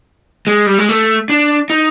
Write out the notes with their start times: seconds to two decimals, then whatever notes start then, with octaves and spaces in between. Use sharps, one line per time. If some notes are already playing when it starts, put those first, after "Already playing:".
0.47 G#3
0.67 G3
0.78 G#3
0.89 A3
1.29 D4
1.70 D#4